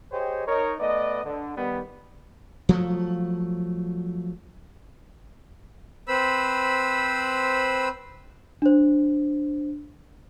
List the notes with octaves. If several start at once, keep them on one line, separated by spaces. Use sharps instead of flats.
G4 G#4 C5 C#5 D#5 G5
D#4 A#4 C#5
A3 B3 B4 D5 D#5
D3
D#3 G3 B3
F3 F#3 A3
C4 B4 C5 B5 E6
D4 C5